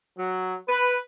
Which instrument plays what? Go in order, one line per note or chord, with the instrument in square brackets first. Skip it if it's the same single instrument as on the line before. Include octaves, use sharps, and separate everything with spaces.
[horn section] F#3
B4